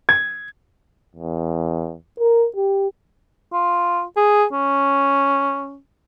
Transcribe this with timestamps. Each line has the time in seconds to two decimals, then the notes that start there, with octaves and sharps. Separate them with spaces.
0.09 G#6
1.15 E2
2.20 A#4
2.56 G4
3.53 F4
4.17 G#4
4.52 C#4